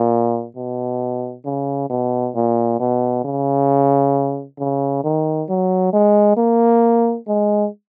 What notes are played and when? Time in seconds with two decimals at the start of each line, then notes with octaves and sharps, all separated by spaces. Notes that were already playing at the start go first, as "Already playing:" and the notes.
Already playing: A#2
0.56 B2
1.45 C#3
1.90 B2
2.35 A#2
2.79 B2
3.24 C#3
4.59 C#3
5.04 D#3
5.49 F#3
5.93 G#3
6.37 A#3
7.27 G#3